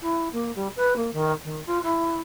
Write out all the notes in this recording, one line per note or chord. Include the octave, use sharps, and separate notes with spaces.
E4
A#3
G3
B4
A#3
D#3
D#3
F4
E4